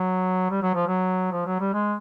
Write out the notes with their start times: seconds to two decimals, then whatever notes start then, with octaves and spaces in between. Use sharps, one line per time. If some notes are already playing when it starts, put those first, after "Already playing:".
Already playing: F#3
0.51 G3
0.62 F#3
0.75 F3
0.88 F#3
1.32 F3
1.46 F#3
1.60 G3
1.73 G#3